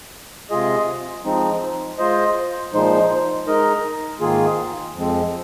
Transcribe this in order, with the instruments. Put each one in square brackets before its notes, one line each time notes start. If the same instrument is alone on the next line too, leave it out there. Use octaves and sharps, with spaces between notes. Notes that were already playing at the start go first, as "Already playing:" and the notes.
[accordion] C3 G#3 F4 G#4 D#5
F3 G#3 C4 D#4
G#3 F4 C5 D#5
A#2 F3 G#3 D#4 C5
G#3 D#4 A#4 D#5
G#2 D#3 A#3 F4 G#4
F2 F3 G#3 C4